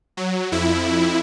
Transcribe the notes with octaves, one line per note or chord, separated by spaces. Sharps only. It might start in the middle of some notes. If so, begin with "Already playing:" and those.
F#3
F2 E4